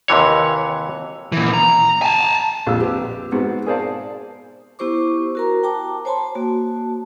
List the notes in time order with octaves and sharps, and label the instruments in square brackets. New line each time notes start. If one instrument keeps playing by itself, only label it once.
[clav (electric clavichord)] D#2 C3 E3 C#5
[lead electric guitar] A#2 E3
A#5
G#5 A5
[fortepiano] A#1 F2 F3 G#3 E6
C4 G4 B4
G#2 B3 C4 F#4
G#4 A#4 C5 D5 F5 A5
[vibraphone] B3 E4 G4 C5 C#6 D6
F#4 A#4 A#5
G5 A5 A#5 D6
C5 C#5 G#5 A5 B5 C6
A#3 F#4 A5